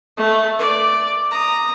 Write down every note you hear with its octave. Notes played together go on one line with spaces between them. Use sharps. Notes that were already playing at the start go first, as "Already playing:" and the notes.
A3
D5
A#5 D#6